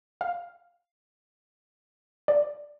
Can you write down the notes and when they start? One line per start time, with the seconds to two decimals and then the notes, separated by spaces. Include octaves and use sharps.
0.21 F5
2.28 D5